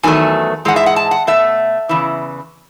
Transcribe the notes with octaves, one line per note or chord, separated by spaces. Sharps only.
E2 D#3 F#3 A3 G#5
G#2 E3 G#3 F#5
E5
F#5
A5
F#5
B2 A3 E5
E2 C#3 E3